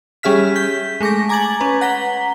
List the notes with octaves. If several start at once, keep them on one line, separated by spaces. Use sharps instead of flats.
G3 C#4 G#4 E5 F6 B6
G6 B6
G#3 A3 C#6 D6 A#6
G#5 A#5 D6 G#6 A6 F#7
C#4 B4
F#5 A#5 B6 G7